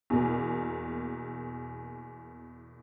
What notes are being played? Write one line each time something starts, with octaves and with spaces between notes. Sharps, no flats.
E2 B2 A#3